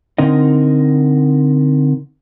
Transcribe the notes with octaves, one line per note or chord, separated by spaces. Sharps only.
D3 C4 D#4 A#4 D#5